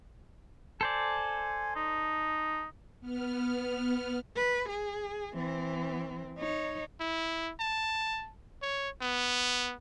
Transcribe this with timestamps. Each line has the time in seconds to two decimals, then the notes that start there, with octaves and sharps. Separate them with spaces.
0.81 A4 C5 D5 G#5
1.76 D#4
3.00 B3 F6
4.36 B4
4.68 G#4
5.34 E3 C4
6.38 D#4 C#5
7.00 E4
7.60 A5
8.62 C#5
9.01 B3